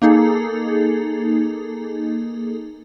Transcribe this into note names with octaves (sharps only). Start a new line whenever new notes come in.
A#3 D#4 G#4 A4